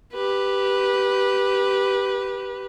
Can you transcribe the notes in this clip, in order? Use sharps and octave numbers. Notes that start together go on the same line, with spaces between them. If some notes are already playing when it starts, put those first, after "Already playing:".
G4 B4